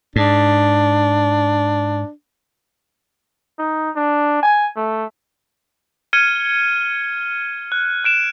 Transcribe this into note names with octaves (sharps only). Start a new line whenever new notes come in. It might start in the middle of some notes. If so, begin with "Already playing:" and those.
G#2 D4
D#4
D4
G#5
A3
F6 G#6 C#7 D#7 G7
F#6
F#6 D7 E7